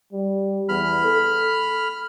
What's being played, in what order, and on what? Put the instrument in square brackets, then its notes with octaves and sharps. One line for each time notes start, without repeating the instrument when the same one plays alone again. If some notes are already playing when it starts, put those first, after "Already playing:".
[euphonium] G3
[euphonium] E2 [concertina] B5 F6
[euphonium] A4